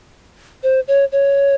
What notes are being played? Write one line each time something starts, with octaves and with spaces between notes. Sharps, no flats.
C5
C#5
C#5